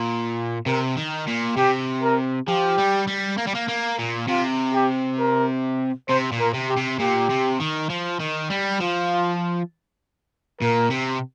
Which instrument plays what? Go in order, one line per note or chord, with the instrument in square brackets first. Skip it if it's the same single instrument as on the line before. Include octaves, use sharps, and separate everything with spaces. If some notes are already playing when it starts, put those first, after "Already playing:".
Already playing: [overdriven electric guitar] A#2
[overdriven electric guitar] C3 [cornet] A#4
[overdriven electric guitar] D#3
A#2
[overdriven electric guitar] C3 [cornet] G4
[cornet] A#4
[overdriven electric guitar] F3 [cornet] G4
[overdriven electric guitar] G3
G3
A#3
G3
A#3
A#3
A#2
[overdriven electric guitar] C3 [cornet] F4
[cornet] G4
A#4
[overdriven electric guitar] C3 [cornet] C5
[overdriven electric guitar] A#2
[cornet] A#4
[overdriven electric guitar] C3
[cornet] G4
[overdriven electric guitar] C3
[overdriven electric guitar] A#2 [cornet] G4
[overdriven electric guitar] C3
D#3
F3
D#3
G3
[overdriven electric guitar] F3 [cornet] F4
[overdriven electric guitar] A#2 [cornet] A#4
[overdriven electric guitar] C3